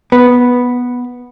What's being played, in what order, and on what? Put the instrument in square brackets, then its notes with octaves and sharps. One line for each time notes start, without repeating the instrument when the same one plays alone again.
[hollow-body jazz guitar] B3